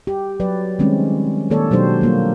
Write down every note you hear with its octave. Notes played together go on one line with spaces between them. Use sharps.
G4
F#3 B4 D5
D#3 G3 G#3 C4 C#4
D#3 A#3 A4 C#5 D5
B2 F#3 D4 G4 C5
G3 A#3 F4